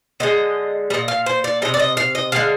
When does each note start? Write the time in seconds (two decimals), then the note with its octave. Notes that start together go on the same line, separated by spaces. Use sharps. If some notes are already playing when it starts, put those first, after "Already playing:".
0.20 D3 F3 G#3 D#5
0.90 A#2 G3 D#5
1.08 F5
1.26 C5
1.44 D5
1.62 C3 G3 D#5
1.74 D5
1.79 D#5
1.97 F5
2.15 D#5
2.32 D3 F3 G#3 F5